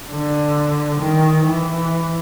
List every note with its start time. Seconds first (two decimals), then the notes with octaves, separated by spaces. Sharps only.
0.11 D3
1.00 D#3
1.45 E3